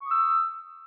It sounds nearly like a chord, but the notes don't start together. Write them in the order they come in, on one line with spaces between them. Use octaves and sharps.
C#6 D#6 E6